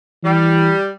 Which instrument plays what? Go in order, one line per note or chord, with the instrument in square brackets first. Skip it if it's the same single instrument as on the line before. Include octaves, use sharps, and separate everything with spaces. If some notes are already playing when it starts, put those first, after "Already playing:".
[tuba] E3 [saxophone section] G3